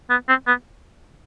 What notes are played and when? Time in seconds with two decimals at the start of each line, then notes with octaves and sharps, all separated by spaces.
0.10 B3
0.28 C4
0.47 B3